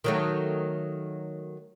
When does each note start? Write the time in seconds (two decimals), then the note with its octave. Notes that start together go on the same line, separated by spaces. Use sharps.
0.04 D#3 F#3 A3